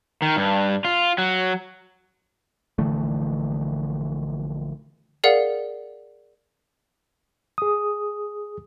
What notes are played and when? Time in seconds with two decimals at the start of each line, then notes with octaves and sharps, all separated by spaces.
0.22 D#3
0.36 G2
0.85 F4
1.18 F#3
2.78 A#1 D3 E3 A3
5.24 G#4 A#4 D5 F5 F#5
7.58 G#4 D#6